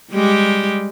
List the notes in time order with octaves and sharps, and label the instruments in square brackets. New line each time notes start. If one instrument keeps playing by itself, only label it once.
[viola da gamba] G3 G#3 G4